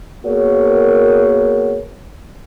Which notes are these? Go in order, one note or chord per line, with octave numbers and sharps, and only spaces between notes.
A#3 B3 F#4 G#4 A#4 C#5